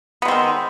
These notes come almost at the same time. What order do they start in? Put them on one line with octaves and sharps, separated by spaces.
B3 G#3 C4 D#3